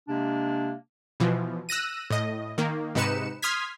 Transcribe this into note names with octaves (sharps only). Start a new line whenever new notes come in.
C3 G#3 A#3 D4
B2 E3 F3
E6 F#6 A#6 D#7
A2 D#5
D#3 A#3
G#2 C3 D#4 B4 C#7 E7
C6 D#6 F6 G#6 B6